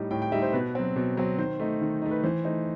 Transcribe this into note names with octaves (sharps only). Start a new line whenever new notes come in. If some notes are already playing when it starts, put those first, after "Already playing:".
Already playing: A2 G3 D#4
A2 G5
G5
G3 D#4 E5
C5
B2 B4
F#3 C4
B2
F#3 C4
D#3 C5
A3 D#4
D#3
A3 D#4
B4
E3 C5
A3 D#4 C5